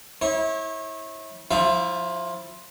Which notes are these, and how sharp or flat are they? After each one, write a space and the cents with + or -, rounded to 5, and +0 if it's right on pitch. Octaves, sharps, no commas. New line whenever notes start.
E4 -30 C#5 -30
F3 +10 E4 -15 E5 +35